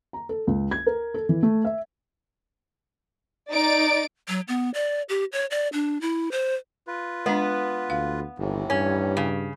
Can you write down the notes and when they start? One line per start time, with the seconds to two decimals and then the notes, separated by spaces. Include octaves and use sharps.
0.13 A#5
0.29 A4
0.47 C#2
0.71 G#6
0.86 A#4
1.14 A4
1.29 E3
1.43 A3
1.65 E5
3.49 D#4 D5 A6 D7
4.28 F#3
4.48 B3
4.74 D5
5.09 G4
5.33 C#5
5.51 D5
5.73 D4
6.01 E4
6.32 C5
6.87 F4 B4
7.26 G#3 B3 D4
7.90 D2 F5
8.38 G1 D#2 A2 E3
8.70 G2 C#4
9.17 C#3